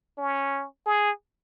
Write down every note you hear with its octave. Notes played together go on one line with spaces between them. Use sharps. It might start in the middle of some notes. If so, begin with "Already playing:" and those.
C#4
G#4